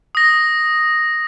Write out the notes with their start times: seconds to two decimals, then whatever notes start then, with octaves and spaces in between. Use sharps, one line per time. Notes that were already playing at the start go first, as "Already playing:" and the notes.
0.15 D#6 A#6